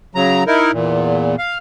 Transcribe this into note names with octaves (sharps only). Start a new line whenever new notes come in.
C#3 F#3 A#5
D#4 E4 A#4
E2 A#2
F5